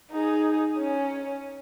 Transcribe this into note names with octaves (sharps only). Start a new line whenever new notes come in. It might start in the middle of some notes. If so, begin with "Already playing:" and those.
D#4 G#4
C#4